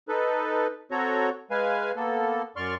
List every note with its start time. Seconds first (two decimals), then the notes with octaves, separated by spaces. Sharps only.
0.08 D#4 A4 B4
0.91 C4 F#4 A4 C#5 A#5
1.51 G#3 B4 F5 G#5
1.96 A#3 B3 A4
2.56 F#2 D5 C6 C#6 F6